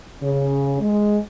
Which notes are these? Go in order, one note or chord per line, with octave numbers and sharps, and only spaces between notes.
C#3
G#3